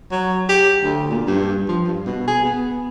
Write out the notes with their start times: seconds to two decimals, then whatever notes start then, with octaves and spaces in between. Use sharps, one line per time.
0.11 F#3
0.49 G4
0.83 D2
1.11 A#2
1.27 G2
1.68 F3
1.87 G2
2.06 B2
2.27 G#4
2.45 B3